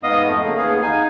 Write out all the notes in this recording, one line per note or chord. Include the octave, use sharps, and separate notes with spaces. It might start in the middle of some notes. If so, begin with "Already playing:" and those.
G#2 B3 D#5 F5 D#6
F2 A3
C#3 A3 A#3
D#2 B3 G#4 F5
D#4 F5 G#5